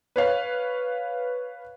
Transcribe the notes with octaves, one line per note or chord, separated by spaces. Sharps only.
B4 C#5 F5